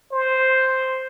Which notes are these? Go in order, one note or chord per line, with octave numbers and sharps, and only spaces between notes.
C5